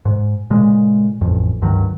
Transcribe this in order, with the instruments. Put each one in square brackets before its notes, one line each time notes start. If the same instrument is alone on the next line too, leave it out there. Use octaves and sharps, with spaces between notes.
[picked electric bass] G#2
A#2 C#3 G#3
A1 F2
C#2 G2 D#3 F#3